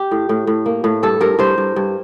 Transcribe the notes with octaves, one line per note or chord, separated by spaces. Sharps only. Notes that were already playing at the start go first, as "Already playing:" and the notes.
Already playing: G4
A2
A2
A2
A#3
A2
G2 A4
G2 A#4
G2 C5
G2
G2